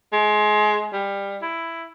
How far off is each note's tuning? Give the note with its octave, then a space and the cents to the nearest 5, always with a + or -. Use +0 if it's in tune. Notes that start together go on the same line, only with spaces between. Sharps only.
G#3 +25
G3 +20
E4 +10